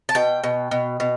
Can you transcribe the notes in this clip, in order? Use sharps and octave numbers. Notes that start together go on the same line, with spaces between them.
A5
B2 G5
B2
B2
B2